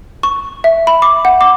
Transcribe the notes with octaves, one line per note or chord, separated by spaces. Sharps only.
C#6
E5
B5
D6
F#5
D6